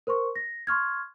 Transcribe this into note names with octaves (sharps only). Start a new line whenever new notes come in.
A#4 C5 C6 C#6
A#6
C6 C#6 F6 G#6